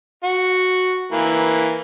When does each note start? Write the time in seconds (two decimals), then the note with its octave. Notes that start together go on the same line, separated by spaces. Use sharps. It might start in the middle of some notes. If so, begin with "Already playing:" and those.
0.24 F#4
1.12 E3 A#3